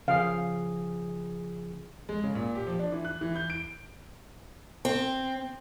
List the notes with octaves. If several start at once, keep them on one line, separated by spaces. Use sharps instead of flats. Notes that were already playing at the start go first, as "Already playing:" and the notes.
C#3 F3 G#4 F5
G#3
C#3
A#2
G4
F3
D4
E3
F#6
E3
G6
D7
C4